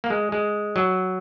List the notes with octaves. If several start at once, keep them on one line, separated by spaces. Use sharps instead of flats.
A#3
G#3
G#3
F#3